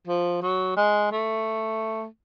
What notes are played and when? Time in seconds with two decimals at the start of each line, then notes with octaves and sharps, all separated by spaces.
0.07 F3
0.42 F#3
0.77 G#3
1.12 A3